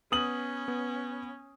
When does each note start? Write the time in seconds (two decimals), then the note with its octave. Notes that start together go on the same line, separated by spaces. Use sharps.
0.12 B3 C#4 D#6 F#7
0.68 B3